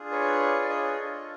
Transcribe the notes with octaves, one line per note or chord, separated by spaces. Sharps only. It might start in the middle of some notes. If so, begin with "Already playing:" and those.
Already playing: D4 F4 G#4
B4 C#5
D5
C#5 D#5
D4 F4 A4